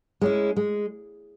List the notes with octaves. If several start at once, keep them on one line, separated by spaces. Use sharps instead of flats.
G#3 C#4 E4
G#3